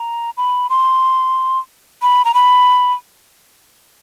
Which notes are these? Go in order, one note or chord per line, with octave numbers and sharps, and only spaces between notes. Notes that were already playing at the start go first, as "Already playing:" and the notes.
Already playing: A#5
B5
C6
B5
A#5
B5